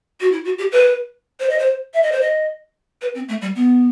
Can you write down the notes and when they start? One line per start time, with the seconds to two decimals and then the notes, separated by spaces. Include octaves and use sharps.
0.20 F#4
0.32 E4
0.45 F#4
0.58 G4
0.72 B4
1.40 C5
1.49 D#5
1.59 C5
1.94 E5
2.03 D#5
2.12 C5
2.21 D#5
3.01 B4
3.15 C4
3.28 A3
3.42 G3
3.55 B3